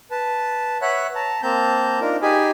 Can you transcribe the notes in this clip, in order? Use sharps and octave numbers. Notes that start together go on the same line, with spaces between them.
B4 A5
B4 C#5 E5 F#5 B5 F#6
A5 A#5
A#3 C4 A5 A#5 G6
D4 D#4 F4 A#4
D#4 G4 G#4 G#5 B5